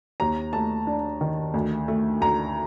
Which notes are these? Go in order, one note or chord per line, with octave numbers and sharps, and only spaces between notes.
D#2 A#5
A3 A5
D4
D#3
D2
A3
D2 A#5